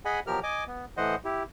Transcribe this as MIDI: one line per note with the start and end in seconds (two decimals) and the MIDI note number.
0.05 0.20 68
0.05 0.20 75
0.05 0.20 78
0.05 0.20 80
0.05 0.20 83
0.27 0.40 47
0.27 0.40 53
0.27 0.40 54
0.27 0.40 67
0.27 0.40 70
0.27 0.40 89
0.43 0.64 75
0.43 0.64 80
0.43 0.64 86
0.67 0.85 59
0.97 1.15 45
0.97 1.15 52
0.97 1.15 72
0.97 1.15 75
0.97 1.15 78
1.25 1.43 64
1.25 1.43 67